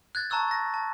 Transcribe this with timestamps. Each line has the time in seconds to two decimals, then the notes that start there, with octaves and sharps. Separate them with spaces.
0.15 F#6 G#6 A6
0.30 A5 A#5 C#6 E6 F#6
0.48 A6 A#6
0.74 A5